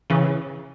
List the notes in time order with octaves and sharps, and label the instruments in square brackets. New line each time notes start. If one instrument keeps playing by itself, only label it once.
[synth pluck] C#3 E3